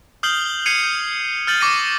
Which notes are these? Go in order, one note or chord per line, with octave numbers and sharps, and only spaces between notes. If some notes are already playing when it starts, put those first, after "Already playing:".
D#6 F6 G6 C7 F#7 G7
G6 G#6 C7 C#7 D#7 F7
G6 D#7
F6 G6 A6 D#7 F#7
C#6 D6 F6 A#6 C#7 D#7